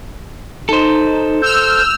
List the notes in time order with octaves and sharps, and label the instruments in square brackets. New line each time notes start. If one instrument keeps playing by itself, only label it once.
[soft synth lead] D#4 [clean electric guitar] A4 C5
[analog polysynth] E6 F6 [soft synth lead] G6